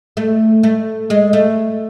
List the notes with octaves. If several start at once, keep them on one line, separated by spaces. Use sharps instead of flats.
A3
A3
G#3
A3